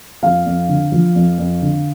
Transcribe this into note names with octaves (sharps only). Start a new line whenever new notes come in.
F2 F5
F2
D3
F3
F2
F2
D3